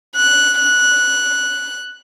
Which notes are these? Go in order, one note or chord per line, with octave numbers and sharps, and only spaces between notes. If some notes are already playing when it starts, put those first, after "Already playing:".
F#6
F#6